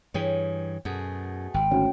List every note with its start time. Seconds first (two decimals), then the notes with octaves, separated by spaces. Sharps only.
0.14 G2 E3 C#4 G#4 G5
0.85 F#2 B2 A3 G#4
1.54 G#1 G5
1.71 D2 C#4